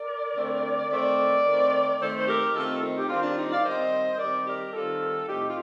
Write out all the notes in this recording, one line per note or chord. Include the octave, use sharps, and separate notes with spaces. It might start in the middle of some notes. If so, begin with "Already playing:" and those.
Already playing: A#4 D5
D3 A3 C4
D#3 A3 C4 A#4 D5
D#3 A3 C4
D#3 A3 C4 A4 C5
C5
G4 A#4
D#3 A3 C4 F4 A4
C4 D#4
G4
D#3 G3 C4 D4 F4
D4 F4
D#4 G4
D5 F5
D#3 G3 C4 C5 D#5
D#3 G3 C4 A#4 D5
G4 A#4
D#3 G3 C4 F4 A4
A2 A3 C4 D#4 G4
F4